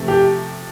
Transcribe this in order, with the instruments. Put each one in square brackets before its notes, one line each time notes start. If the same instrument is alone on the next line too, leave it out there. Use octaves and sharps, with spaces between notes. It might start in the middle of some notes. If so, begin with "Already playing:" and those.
Already playing: [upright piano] C3 F3 A3
[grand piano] G4